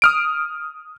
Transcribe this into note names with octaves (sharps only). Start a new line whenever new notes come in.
D#6 F6 D7